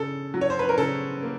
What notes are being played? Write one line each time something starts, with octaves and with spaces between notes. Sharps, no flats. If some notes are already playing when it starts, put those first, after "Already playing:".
Already playing: C#3 A4
F#3
C#5
C5
B4
A#4
C#3 A4
A#3